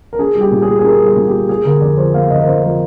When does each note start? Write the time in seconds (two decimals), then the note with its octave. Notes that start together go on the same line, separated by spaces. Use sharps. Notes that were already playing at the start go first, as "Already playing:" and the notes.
0.13 A#4
0.19 D4 G#4
0.35 G3
0.41 G4
0.51 A#2
0.62 G#4
0.68 A#3
0.79 G#4
0.84 D4 A#4
1.01 G3
1.06 G#4
1.16 A#2
1.27 G4
1.33 A#3
1.49 A#3 G#4
1.65 D3 A#4
1.81 F2 D5
1.97 F3 C5
2.14 A#3 F5
2.30 D3 D#5
2.40 A#4
2.46 F2 C5
2.63 F3 A#4